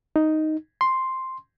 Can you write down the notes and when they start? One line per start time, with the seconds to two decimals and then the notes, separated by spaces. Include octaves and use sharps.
0.16 D#4
0.81 C6